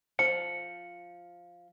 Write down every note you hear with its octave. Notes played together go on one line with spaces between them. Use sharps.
F3 C#7